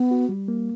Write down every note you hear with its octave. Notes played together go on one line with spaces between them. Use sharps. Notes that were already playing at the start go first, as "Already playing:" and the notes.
Already playing: B3
F#4
G3
A#3